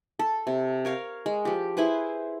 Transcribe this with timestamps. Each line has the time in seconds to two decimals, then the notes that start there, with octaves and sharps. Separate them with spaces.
0.19 A4
0.47 C3
0.85 A#4 C#5 F5
1.26 G#3
1.45 F3 G4
1.77 E4 G#4 B4 C5